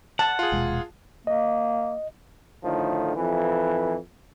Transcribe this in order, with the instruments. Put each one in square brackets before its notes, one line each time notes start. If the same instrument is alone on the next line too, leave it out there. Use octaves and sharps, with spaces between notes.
[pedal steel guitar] F#5 [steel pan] A5
[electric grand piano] F4 G#4
[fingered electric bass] D#1 B2 G#3
[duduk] A#3 [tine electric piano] D#5
[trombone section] A2 D3 D#3 F3
F2 E3